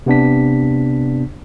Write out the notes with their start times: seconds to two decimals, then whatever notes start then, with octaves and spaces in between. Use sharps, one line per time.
0.06 C3 B3 D4 B6